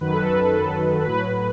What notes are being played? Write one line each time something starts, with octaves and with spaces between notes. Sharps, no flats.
F#2 D#3 F#3 B4
A4
B4
B4
A4
A2 F#3 B4